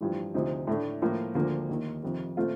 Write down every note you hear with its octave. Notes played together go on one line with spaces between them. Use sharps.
A1 G2 F3
D2 C3 F3 C4 D#4
A2 A3 D4
A2 F3 A#3 F4
D2 D3 F3 A#3 F4
D#2 D#3 A#3
F2 C3 D#3
A#2 A3 C4 F4